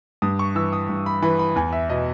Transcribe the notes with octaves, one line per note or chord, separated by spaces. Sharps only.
G2 D#6
C#6
E3 E6
D#6
G2
B5
E3 B5
B5
E2 G#5
E5
B2 D#5